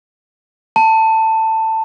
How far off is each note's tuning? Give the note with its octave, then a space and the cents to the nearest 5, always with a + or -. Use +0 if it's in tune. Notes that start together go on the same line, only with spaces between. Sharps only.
A5 +15